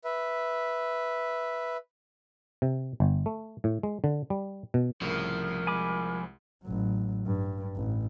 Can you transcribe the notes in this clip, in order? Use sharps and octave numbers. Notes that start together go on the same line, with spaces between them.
B4 E5
C3
G1
A3
A2
G#3
D3
G3
B2
C2 A2 C#3 F3 A#4
C2 G#3 G#5 B5 D6
A1 F#3
G2
A1